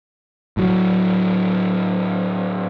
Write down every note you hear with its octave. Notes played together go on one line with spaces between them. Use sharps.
A2 F#3